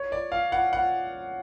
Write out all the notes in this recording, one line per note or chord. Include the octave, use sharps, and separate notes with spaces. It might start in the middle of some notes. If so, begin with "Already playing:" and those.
Already playing: C#5
D5
F5
F#5
F#5